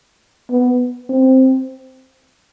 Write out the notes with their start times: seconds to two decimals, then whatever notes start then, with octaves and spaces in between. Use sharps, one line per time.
0.50 B3
1.09 C4